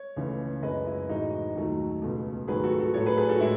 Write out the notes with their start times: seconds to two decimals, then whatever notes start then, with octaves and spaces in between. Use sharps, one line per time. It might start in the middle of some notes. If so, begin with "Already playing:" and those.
Already playing: C#5
0.16 C#2 C#3 E3 A3
0.62 F#2 C#3 G#3 B4 D#5
0.86 E4
1.09 A2 E3 G#3 D#4 F#4
1.55 D#2 D#3 F#3 A3
2.02 C#2 B2 A3
2.48 G#2 D#3 F#3 A3 G#4 B4
2.63 F#4 A4
2.79 F#4 A4
2.94 A2 F#3 A3 A4 C#5
3.06 G#4 B4
3.18 G#4 B4
3.29 F#4 A4
3.40 A2 G#3 E4